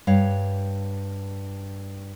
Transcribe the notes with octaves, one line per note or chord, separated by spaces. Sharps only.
G2 C#5 F5